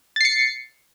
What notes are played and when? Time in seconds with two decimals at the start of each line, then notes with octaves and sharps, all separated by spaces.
0.16 A6
0.21 C7
0.25 C#7